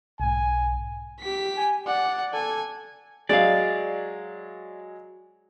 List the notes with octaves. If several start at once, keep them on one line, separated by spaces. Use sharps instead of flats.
B1 G#2 G#5
G4 B6
G#5
D5 F#5
A4 G#5
F#3 G#3 D5 F5